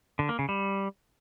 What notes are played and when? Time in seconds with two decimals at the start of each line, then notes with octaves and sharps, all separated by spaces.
0.19 D3
0.29 A#3
0.39 C#3
0.49 G3